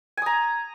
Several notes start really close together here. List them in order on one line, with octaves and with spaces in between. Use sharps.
G#5 D#6 A#5